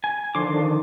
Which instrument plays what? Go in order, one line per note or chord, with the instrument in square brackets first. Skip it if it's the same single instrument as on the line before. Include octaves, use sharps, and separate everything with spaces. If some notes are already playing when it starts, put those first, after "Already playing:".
[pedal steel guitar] G#5
[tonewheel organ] D3 F3 D4 [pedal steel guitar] D#3 C6 D6